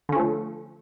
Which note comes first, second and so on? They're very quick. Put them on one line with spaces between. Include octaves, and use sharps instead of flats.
D3 C#4 F3 A3